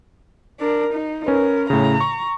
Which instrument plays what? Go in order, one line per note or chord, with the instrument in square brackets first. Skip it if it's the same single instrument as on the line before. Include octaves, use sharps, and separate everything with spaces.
[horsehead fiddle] D4 A#4
D#4
[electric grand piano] C#4 B4 [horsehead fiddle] A#4
[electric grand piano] A2 C#3 [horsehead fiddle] A#5
[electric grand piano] C#6